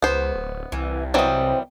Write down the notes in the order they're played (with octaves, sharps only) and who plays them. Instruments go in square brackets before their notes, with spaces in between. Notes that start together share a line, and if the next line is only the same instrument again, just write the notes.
[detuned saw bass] C#2 [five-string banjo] B3 C5
[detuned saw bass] D1
[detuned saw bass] C2 [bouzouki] E3
[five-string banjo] E3 F#3 G3 [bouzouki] C4 D#5